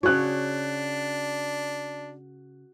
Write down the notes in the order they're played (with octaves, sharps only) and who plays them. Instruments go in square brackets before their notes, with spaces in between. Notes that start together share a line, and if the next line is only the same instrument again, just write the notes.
[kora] C#3 C#5 [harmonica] D4 [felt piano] F#4 F#6